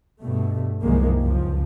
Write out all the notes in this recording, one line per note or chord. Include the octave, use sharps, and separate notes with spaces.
G2 B2 A3
C2 F#2 D#3 F3 G#3 A#3
C#2 F3